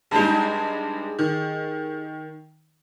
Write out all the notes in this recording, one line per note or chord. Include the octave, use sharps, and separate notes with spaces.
G2 G#3 D#4 G4 G#4
D#3